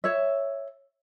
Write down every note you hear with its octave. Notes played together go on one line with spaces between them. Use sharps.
C#5 E5